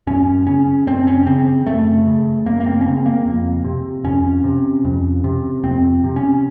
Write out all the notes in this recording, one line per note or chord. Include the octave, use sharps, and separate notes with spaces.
F#2 C#4
C#3 C#4
F#2 C4
C#4
C#3 C4
F#2 A3
C#3
F#2 A#3
A#3
C4
C#4
C#3 C4
A#3
F2
C3
F2 C#4
C3
F2
C3
F2 C4
C3
C#4